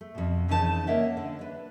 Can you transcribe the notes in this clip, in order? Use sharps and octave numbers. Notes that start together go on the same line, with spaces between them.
A3
F2 B2
F2 C#3 E3 D#4 F#4 A5
A#3 A#4 C#5 D#5 E5 F#5
D3
B4 D5